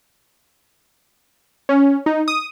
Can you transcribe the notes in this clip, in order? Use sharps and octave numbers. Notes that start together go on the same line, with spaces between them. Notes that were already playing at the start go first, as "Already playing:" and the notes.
C#4
D#4
D#6